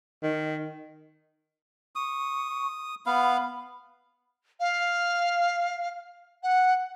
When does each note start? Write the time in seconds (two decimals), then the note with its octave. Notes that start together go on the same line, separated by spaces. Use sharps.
0.22 D#3
1.95 C#6 D#6
3.06 B3 F5 B5
4.60 F5
6.43 F#5